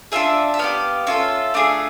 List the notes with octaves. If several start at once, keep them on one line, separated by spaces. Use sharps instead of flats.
D4 F4 G#4 E5
E5
B3 E4 G4 F5
C#4 F4 A4 E5
A3 D4 F4 G#4